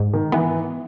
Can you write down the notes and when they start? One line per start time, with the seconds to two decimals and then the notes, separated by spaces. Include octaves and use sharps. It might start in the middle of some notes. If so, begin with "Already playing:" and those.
Already playing: G#2
0.14 D#3
0.32 E3 B3